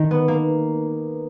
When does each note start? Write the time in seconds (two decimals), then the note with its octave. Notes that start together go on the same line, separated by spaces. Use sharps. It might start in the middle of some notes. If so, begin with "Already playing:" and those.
Already playing: D#3
0.11 B3
0.28 A#3